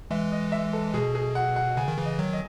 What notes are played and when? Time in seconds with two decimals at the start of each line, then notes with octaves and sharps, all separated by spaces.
0.11 E3 G#3 E5
0.32 D#5
0.52 E5
0.73 A4
0.94 B2 G#4
1.15 G#4
1.35 F#5
1.56 F#5
1.77 C#3 G#5
1.88 D#3
1.97 C#3 E3
2.05 D#5
2.19 D#3 F#3
2.33 D#5